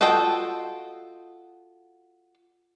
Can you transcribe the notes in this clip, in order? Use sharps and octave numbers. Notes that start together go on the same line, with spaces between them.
F4 F#4 A4 D#5 G5